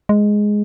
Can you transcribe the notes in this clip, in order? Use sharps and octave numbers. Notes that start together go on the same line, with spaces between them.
G#3